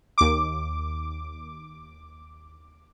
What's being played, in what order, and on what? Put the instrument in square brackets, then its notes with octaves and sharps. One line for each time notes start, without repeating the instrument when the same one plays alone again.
[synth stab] D#2 D6